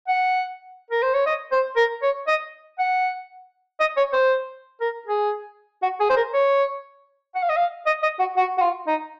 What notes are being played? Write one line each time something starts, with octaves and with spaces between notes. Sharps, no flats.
F#5
A#4
C5
C#5
D#5
C5
A#4
C#5
D#5
F#5
D#5
C#5
C5
A#4
G#4
F#4
G#4
C5
A#4
C#5
F#5
F5
D#5
F5
D#5
D#5
F#4
F#4
F#4
F4
D#4